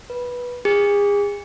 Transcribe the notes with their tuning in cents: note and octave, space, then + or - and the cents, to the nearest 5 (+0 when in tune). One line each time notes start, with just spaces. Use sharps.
B4 -15
G#4 -35